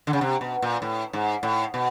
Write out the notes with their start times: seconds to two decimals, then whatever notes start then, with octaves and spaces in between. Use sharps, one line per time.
0.07 D3
0.13 C#3
0.21 C3
0.41 B2
0.62 A#2
0.82 A2
1.13 G#2
1.43 A2
1.74 B2